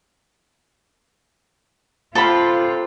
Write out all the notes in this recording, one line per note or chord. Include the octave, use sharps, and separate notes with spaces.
C3 F4 A4 B5